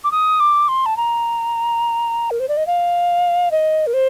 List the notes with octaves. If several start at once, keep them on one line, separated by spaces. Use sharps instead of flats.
D6
D#6
D6
C6
A5
A#5
A#4
C5
D5
D#5
F5
D#5
A#4
C5